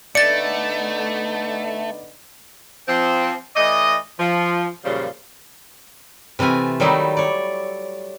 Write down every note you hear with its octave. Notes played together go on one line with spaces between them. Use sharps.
D3 A3 B3 D#4 D5 A6 C#7
F3 C4
E3 A3 D5 D#5
F3
F#2 A#2 C#3 F3 G3
C3 E3 A3 F4 G#5
D#3 F#3 G3 A3 D#4 E4
C#5 D5